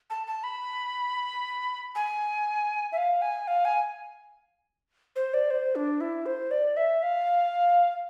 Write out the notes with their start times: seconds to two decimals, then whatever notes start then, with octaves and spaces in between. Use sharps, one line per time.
0.10 A5
0.27 A5
0.44 B5
1.95 G#5
2.92 E5
2.97 F5
3.22 G#5
3.48 F5
3.65 G#5
5.16 C5
5.34 D5
5.50 C5
5.76 D4
6.01 E4
6.26 C5
6.51 D5
6.77 E5
7.03 F5